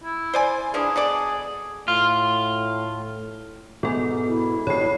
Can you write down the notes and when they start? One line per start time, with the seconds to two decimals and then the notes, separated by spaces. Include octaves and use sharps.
0.04 E4
0.34 C5 D5 G#5
0.74 E3 F3 D4 G#4
0.96 B2 A4 D5
1.88 A2 F4
3.83 G#2 B2 B3 A4
4.28 E4
4.67 G2 B2 C#5 C7